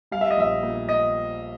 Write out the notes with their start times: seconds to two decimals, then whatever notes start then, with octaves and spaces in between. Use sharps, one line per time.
0.11 G3 F5
0.21 E5
0.31 D#5
0.37 A#1 E5
0.63 A#2
0.89 D#5